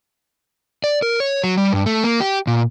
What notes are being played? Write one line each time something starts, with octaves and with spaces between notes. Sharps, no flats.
D5
A#4
C#5
F#3
G3
G2
A3
A#3
G4
A#2